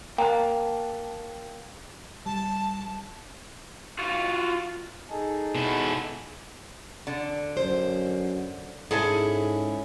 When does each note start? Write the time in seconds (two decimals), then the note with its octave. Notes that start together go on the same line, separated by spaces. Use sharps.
0.18 A#3 G5 A5 F#6
2.26 G3 A5
3.99 F4 F#4
5.10 D#4 G#4 A4
5.55 B2 E4
7.07 D3
7.57 F#2 C5
8.91 G#2 C#4 E4 G#4 A4 G#5